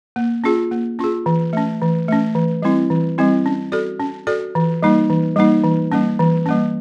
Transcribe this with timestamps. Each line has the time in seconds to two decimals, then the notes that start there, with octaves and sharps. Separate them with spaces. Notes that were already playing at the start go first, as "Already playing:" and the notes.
0.16 A#3
0.44 C#4 F4 G#4
0.71 A#3
0.99 C#4 F4 G#4
1.26 E3
1.53 A3 C#4
1.81 E3
2.08 A3 C#4
2.35 E3
2.62 G3 C4 E4
2.90 E3
3.18 G3 C4 E4
3.46 C#4
3.72 F#4 A4 D5
4.00 C#4
4.27 F#4 A4 D5
4.55 E3
4.83 G3 A#3 D#4
5.10 E3
5.36 G3 A#3 D#4
5.64 E3
5.92 G3 A#3 C#4
6.19 E3
6.46 G3 A#3 C#4